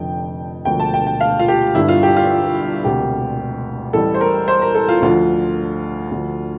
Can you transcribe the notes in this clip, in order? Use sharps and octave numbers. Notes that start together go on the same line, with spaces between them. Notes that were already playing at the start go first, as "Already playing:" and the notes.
Already playing: F1 F2 D3 G5
E1 D2 D3 F3 G5
A5
G5
G5
F5
F4
G4
G1 G2 D3 E4
F4
G4
F4
E1 D2 C3 G4
A1 A2 G3 A4
C5
A#4
C5
A#4
A4
F4
D2 D3 F3 F4
D2 D3 F3